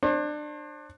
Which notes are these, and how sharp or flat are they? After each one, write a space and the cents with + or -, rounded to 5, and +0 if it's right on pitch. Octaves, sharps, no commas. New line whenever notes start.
D4 +25 C5 +45